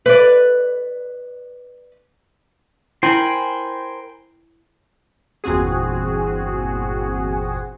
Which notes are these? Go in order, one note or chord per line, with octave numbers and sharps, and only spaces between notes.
B4 D5
E4 A#4 C5 G5 G#5 B5
G1 E2 A#2 C4 F#4 G#4